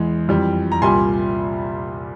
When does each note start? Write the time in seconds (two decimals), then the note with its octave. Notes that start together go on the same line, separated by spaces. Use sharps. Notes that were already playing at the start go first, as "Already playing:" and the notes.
Already playing: E2 E3 G#3
0.29 F2 E3 G3
0.72 A#5
0.82 C2 A#2 G3 G#5 C6